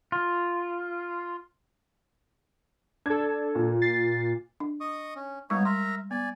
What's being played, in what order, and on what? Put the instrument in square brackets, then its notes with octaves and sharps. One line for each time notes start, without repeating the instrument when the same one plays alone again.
[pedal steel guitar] F4
[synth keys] D4 A4 [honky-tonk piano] G#6
[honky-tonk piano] A#2
[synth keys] A6 C7
[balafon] D4
[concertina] D#5 C#6 D#6
C#4
[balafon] G3 G#3 C#6 [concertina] B3 D#4 C#5
[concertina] A#4 E5 A#5 [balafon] C6
[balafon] B3 [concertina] D5 G#5